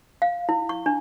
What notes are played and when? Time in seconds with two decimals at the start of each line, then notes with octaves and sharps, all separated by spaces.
0.22 F5
0.49 E4
0.69 C#6
0.86 D4